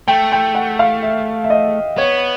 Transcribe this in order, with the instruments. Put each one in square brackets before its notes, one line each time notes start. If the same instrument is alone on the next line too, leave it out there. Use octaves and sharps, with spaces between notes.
[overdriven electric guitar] A3 [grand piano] G5
[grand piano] G5
F#5
F5
E5
E5
D#5
[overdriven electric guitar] B3 [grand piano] C#5